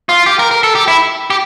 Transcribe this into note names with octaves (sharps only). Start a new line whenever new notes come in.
F4
G4
A#4
A#4
A4
G4
E4
G4